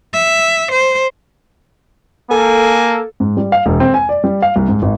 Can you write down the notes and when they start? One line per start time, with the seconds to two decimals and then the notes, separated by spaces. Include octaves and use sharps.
0.13 E5
0.71 C5
2.31 A#3 A4 G#5
3.20 G#2
3.37 G3
3.52 F5
3.66 E1
3.80 C4
3.94 G#5
4.09 D5
4.24 G3
4.42 F5
4.56 C2
4.68 G#2
4.82 G#1